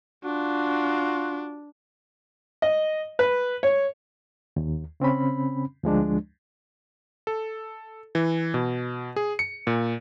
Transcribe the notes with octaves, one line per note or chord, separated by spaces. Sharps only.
D4 F4 F#4
D#5
B4
C#5
D#2
C#3 C4 C#4 B5
D2 F3 G#3 D4
A4
E3
B2
G#4
C#7
A#2